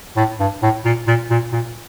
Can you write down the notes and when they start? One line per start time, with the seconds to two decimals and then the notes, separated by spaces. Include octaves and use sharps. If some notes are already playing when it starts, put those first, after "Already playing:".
0.16 A2
0.40 G2
0.62 A2
0.84 A#2
1.07 A#2
1.30 A#2
1.52 A#2